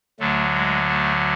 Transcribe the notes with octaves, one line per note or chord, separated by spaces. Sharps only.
D2 D3 F#3 A3
G#3
A3